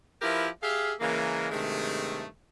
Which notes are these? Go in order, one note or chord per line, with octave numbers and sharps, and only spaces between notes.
F3 E4 G4 A#4 B4 E5
G4 G#4 E5 F5
C#3 E3 G#3 A#3
G2 C3 D#3 G#3 A3